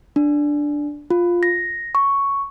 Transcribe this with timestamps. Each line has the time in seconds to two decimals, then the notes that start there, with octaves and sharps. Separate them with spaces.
0.16 D4
1.10 F4
1.43 A#6
1.95 C#6